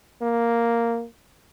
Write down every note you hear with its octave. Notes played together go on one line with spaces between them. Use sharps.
A#3